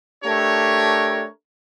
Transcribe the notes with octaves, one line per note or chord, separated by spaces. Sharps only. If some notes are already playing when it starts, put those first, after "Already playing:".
A3 D4 G4 A#4 C#5